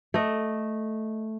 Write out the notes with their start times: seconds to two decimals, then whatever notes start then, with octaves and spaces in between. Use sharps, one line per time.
0.14 A3 D#5